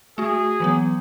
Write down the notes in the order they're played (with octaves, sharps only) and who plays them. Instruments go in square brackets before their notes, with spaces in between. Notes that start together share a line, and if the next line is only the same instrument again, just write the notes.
[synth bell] A3 F#4 [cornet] G#4
[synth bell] E3 F#3 B3